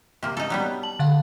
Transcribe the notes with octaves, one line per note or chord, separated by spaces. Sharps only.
C3 A#3
D#4 A4
F#3 G3 B3
A5 F#7
D3 F5 F#5